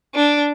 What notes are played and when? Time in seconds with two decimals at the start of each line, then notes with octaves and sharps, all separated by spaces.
0.15 D4